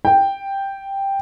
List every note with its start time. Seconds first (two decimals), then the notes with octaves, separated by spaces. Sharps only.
0.05 G5